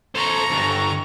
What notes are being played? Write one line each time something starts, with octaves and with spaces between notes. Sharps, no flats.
A4 C5 A#5 C#6
G2 D3